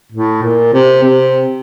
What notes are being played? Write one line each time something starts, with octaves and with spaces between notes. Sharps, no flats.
A2
A#2
C3
C3